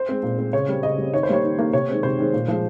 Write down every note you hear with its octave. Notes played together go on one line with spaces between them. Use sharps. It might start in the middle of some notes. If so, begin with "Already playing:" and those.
Already playing: C5
G#3 C4
A#2
G#3 C4
C#3 C#5
G3 C4
C#3 D#5
G3 C4
D#3 C#5
C5
G3 A#3 C#5
D#3
G3 A#3
C3 C#5
D#3 G#3 C4
C3 C5
D#3 G#3 C4
A#2
F3 G#3